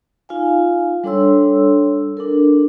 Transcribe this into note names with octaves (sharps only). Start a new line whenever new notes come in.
D#4 F4 F5 G#5
G3 D4 A4 C#5 C6 E6
D4 A4 A#4